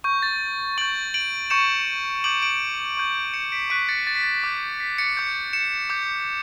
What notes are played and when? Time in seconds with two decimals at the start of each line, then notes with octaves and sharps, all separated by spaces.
0.04 C#6 G6
0.22 A6
0.78 C#6 G6 D7 F#7
1.14 D7 F#7
1.50 C#6 G6 C#7 E7
2.24 D6 G6 D7 F#7
2.42 D7 F#7
2.97 C#6 G6
3.34 C#7 E7
3.52 B6 D7
3.70 C#6 F#6 B6 D7
3.89 A6 C#7
4.07 A6
4.15 B6
4.23 A6
4.44 D6 G6
4.80 B6
4.98 A6 C#7
5.17 D6 G6
5.53 C#7 E7
5.90 D6 G6